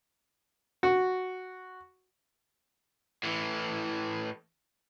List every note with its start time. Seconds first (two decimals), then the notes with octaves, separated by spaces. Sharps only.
0.83 F#4
3.23 A2 E3